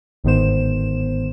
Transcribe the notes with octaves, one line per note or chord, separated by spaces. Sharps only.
G1 G#2 D#3 B3 C5 E7